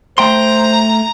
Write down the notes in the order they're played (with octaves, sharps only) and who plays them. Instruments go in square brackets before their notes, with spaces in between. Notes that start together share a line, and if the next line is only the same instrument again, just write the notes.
[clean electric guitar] A3 G5 C6 [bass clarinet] C5 [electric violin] A#5